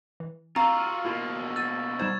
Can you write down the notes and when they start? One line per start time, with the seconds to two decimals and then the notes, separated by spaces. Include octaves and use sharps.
0.20 E3
0.56 C4 F4 F#4 F5 A#5 C#6 E6
1.05 B2 A#3 E4 F4
1.56 E6 A6 D#7
1.99 G3 D#4 C5 G#6 E7